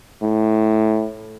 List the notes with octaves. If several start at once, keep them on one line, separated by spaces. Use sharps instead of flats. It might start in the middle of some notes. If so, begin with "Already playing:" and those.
A2